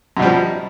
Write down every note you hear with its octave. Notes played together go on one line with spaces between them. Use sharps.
F#2 B2 F3 G3